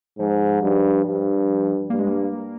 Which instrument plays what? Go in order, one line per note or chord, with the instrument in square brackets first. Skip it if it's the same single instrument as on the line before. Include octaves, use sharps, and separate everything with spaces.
[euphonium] G#2 [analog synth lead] F3
[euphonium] G2
G2
[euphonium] G2 [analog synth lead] A#3
[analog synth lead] G#3
A#3